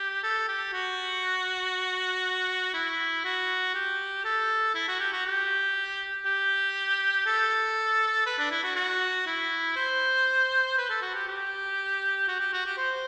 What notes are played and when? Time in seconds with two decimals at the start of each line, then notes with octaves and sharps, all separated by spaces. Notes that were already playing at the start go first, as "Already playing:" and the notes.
Already playing: G4
0.23 A4
0.48 G4
0.73 F#4
2.74 E4
3.25 F#4
3.75 G4
4.25 A4
4.75 E4
4.88 F#4
5.00 G4
5.13 F#4
5.26 G4
6.26 G4
7.26 A4
8.26 B4
8.39 D4
8.51 E4
8.63 F#4
8.76 F#4
9.27 E4
9.76 C5
10.78 B4
10.90 A4
11.02 F#4
11.15 G4
11.28 G4
12.28 F#4
12.40 G4
12.53 F#4
12.66 G4
12.78 C5